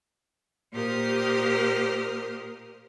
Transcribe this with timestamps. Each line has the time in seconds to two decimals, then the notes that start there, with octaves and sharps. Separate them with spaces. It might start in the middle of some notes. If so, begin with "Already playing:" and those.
0.73 A#2 G4 A#4 C5 D#6 F6